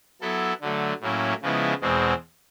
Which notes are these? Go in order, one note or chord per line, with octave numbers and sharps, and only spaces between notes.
F#3 B3 E4 A4
D3 F#3 A3
A2 F#3 A#3 C#4 E4
C#3 F3 G#3 B3 E4
E2 B2 G#3 C4